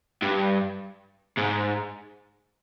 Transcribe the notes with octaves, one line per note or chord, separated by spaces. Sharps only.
G2
G#2